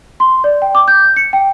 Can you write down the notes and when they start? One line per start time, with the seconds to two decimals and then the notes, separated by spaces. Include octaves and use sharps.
0.20 C6
0.44 D5
0.62 G5
0.75 D6
0.88 G6
1.16 C#7
1.33 G5